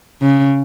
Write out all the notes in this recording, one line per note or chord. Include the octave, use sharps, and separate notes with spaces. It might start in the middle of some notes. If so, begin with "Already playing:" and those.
C#3